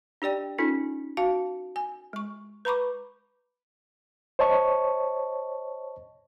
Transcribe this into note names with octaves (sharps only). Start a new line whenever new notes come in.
D4 G4 D5 G5
C#4 D#4 F4 A4
F#4 F5 A5
G#5
G#3 C#6
B4 A#5 B5 C#6 D6
C5 C#5 D#5 A5 C#6